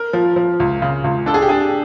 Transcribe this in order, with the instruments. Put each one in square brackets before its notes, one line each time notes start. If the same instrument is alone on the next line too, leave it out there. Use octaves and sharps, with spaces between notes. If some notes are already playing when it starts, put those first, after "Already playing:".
Already playing: [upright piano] A#4
[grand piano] F3
F3
C#2
C#3
C#2
[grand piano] D4 [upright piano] A4
[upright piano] G#4
G4
[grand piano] D4 [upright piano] G#4